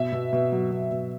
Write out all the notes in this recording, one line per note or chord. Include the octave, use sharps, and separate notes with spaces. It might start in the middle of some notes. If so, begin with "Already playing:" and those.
Already playing: B2 B3 E5
B2
B2
F#3
B2
B2